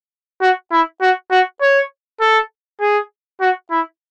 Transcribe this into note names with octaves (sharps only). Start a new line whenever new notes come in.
F#4
E4
F#4
F#4
C#5
A4
G#4
F#4
E4